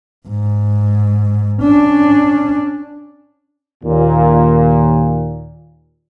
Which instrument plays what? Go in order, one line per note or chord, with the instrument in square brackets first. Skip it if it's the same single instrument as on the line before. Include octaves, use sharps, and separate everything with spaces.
[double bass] G#2
C#4 D4
[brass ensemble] D#2 A#2